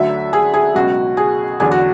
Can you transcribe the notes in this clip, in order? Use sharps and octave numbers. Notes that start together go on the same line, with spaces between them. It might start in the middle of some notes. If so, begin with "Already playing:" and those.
Already playing: D2 D3 F#3 E5
G#4
G#4
C#2 B2 F#3 F#4
G#4
E2 D3 F#3 G#4
F#4